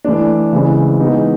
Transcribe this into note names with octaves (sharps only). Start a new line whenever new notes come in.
E3 A3 D4
C#3 E3 G#3 C4
E3 G#3 B3 D#4 F#4